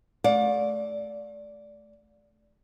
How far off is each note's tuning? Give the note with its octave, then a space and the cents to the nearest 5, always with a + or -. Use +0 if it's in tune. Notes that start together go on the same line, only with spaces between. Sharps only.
A3 -25 D5 -10 F5 +40